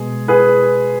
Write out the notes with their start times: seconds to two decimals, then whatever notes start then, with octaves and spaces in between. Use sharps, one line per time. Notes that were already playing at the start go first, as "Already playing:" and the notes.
Already playing: B2 G#3 G#4
0.28 G#4 B4